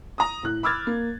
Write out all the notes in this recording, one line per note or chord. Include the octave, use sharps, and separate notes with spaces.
A#5 D#6
A2 F#6
B5 D6 E6 F6 G#6 A6
A#3